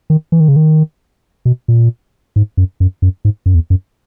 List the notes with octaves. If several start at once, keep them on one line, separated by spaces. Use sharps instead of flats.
D#3
E3
D#3
C#3
D#3
B2
A#2
G#2
F#2
F#2
F#2
G#2
F#2
E2
F#2